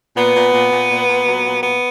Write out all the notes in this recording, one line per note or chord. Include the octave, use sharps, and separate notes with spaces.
A#2 B3
A#2
A#2
A#2
A#2
A#2
F#3
A#2
A#2 B3